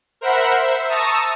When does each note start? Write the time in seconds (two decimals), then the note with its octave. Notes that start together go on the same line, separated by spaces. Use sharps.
0.21 A#4 C5 E5 F#5 B5
0.60 C5 E5
0.89 A5 A#5 C#6 D#6 E6